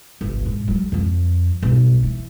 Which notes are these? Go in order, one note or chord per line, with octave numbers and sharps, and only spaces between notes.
G1 C2
G#2
F#3 G#3
F2 F3
B1 G2
E3